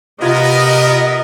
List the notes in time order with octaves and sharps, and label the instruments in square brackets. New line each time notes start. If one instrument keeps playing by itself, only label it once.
[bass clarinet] C3 [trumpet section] B3 A#4 [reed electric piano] F4 G#6 [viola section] D#5